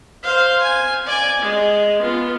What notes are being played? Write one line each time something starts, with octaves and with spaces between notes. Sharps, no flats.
C5 F5
G#5
D5 G#5
G#3
B3 F4